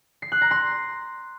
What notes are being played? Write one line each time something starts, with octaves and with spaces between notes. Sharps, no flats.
C7
F#6
A#5
C6